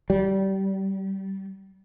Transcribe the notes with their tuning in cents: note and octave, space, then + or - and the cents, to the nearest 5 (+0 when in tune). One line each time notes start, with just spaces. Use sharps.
G3 -25